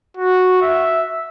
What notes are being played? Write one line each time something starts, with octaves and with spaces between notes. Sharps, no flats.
F#4
E5